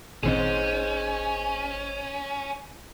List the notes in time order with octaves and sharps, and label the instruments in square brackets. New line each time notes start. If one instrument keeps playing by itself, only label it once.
[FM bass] G#1 [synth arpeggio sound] A#2 D#3 C4 [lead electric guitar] C#4 [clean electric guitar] G#4 C5 D#5